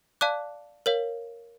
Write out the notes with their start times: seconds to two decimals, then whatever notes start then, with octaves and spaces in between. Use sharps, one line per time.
0.21 D5 F5 A5 D6 F#6
0.86 A#4 C#5 F5